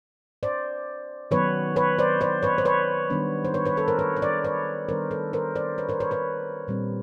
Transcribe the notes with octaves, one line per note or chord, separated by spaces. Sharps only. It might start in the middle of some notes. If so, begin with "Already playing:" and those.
C5 D5
D#3 F#3 B3 B4 C#5
B4 C#5
C5 D5
C5 D5
B4 C#5
C5
B4 C#5
D#3 G3 B3 D4
C5
B4 C#5
B4 C#5
A4 B4
A#4 C5
B4 C#5
C#5
C5 D5
B4 C#5
D#3 G3 B3 D4 A#4 C5
A4 B4
A#4 C5
C5 D5
B4 C#5
A#4 C5
B4 C#5
B4 C#5
A#2 G3 C4